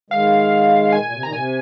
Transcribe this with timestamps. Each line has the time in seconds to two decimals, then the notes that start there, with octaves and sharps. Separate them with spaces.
0.10 D#3 G#3 F5
0.92 A#2 G#5
1.03 A#2
1.12 C3
1.23 A#2 D#3 A#5
1.32 C3 G#5